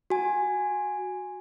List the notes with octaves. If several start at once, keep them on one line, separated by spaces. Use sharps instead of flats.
F#4 G#5